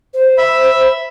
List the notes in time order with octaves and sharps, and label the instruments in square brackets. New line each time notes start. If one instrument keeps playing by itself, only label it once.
[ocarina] C5
[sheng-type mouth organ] E5 B5